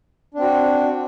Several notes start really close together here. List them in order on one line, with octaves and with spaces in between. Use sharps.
D4 C4 F#4